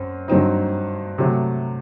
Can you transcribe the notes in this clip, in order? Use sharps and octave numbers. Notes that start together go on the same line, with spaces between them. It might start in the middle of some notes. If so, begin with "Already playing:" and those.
Already playing: F#2 C4
G2 F#3 C4 D#4
C3 F#3 A3